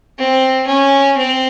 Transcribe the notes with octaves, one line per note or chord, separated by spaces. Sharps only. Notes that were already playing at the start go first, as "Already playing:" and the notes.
C4
C#4
C4